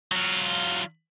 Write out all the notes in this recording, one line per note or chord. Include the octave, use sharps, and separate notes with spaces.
F#3 F4